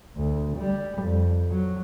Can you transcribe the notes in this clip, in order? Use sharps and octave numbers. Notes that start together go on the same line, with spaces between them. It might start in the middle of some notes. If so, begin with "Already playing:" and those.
D2
G3
F2
F#3